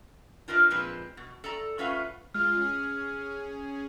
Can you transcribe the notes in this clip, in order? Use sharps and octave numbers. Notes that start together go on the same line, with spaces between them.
D4 F4 A#4 B4 D#5
A#2 F3 G#3 C4 B4
B2
A4 D5 A#5
A3 C#4 F4 B4 F5 F#5
G#3 F4 F6
C#4 G#4